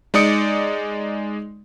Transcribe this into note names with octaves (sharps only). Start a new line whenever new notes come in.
G#3 D#4 D5 D#6 C#7 D7